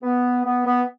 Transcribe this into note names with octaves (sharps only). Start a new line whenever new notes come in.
B3
B3
B3